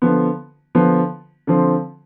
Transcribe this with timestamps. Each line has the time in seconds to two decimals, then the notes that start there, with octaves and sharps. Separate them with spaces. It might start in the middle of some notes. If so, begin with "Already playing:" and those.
0.02 D3 F3 B3
0.75 D3 F3 B3
1.47 D3 F3 C4